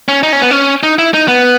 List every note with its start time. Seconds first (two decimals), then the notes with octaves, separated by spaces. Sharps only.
0.08 C#4
0.23 D#4
0.33 C#4
0.42 B3
0.51 C#4
0.83 D#4
0.99 E4
1.14 D#4
1.28 B3